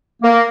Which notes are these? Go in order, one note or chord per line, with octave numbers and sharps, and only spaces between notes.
A#3